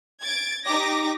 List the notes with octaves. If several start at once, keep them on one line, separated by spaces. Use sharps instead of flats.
G#6 A6 D7
D#4 G4 D6 A#6